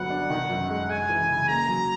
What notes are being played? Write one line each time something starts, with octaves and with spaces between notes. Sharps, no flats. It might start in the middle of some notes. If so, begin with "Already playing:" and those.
Already playing: G1 F#3 B3 F#5
D4
D#3
F#2
G#3
G#3 G#5
E3
C#3
A#3 A#5
F#3